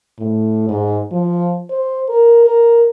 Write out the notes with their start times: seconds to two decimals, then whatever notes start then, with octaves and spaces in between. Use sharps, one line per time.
0.19 A2
0.69 G#2
1.11 F3
1.70 C5
2.09 A#4
2.46 A#4